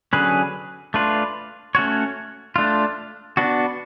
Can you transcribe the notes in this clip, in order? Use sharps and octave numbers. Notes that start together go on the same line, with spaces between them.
D3 F#3 C#4 G#4 B4
A3 D4 F4 B4
A3 C#4 F#4 C#5
A3 D4 F4
B3 D4 F#4